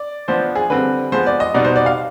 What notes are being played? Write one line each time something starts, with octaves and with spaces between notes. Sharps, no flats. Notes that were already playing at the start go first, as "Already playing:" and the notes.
Already playing: D5
F3 B3 D4 C5
G#4
D3 G3 C4 B4
F3 G#3 B3 C5
D5
D#5
B2 G3 B3 D#4 D5
C5
D5
F5